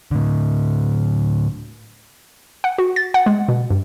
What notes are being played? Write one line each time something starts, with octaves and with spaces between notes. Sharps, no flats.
A2 D3
F#5
F#4
A6
F#5
G#3
B2
G2